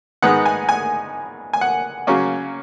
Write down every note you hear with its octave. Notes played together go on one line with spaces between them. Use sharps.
G#2 D#3 G#3 B3 D#4 F#5
G#5
G#5
G#5
F#5
C#3 F#3 A#3 C#4